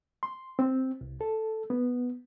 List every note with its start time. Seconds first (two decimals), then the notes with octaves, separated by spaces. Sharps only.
0.23 C6
0.59 C4
1.01 C2
1.21 A4
1.70 B3